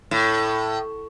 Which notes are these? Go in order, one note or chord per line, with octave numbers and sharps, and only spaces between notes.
A2